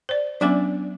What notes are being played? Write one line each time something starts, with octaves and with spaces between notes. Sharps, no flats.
C5 D5
F#3 B3 C#4 D4 D5 E5